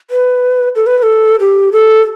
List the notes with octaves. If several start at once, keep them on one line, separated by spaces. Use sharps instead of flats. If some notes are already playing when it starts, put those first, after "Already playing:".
B4
A4
B4
B4
A4
G4
A4